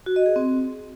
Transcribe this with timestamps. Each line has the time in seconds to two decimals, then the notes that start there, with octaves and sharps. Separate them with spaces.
0.06 F#4
0.16 D#5
0.26 G#4
0.36 C4